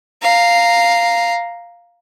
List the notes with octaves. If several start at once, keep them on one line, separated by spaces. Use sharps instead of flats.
F5 A#5